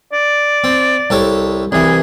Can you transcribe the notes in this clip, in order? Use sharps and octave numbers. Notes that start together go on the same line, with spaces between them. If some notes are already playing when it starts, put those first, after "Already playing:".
D5
C4
C2 A4 C#5
C2 E3 G#4